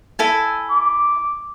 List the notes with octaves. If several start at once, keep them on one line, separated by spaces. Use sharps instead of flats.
E4 A4 G#5
D6